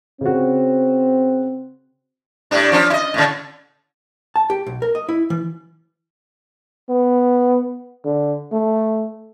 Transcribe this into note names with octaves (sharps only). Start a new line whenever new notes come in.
C#3 C4 F#4
A2 G3 D4
F3 C#4 D4
E4 D#5
A2 C#3
A5
G4
B1
A#4
D#5
E4
E3
B3
D3
A3